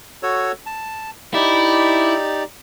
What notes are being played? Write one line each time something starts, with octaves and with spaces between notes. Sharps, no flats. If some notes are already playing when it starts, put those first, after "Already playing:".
F#4 A4 C#5
A5
D#4 E4 G4 D5